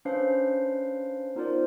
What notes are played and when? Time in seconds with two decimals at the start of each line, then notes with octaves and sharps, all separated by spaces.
0.05 C#4 D4 B4 C5 F5 C7
1.35 B3 D#4 F4 A#4 C5 D5